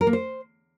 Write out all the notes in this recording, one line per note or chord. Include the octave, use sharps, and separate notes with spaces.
A#4
A#3
C5